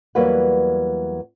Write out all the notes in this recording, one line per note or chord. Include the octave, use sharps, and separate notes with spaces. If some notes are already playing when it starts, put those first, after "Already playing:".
E2 F#3 G3 A#3 B4 F#5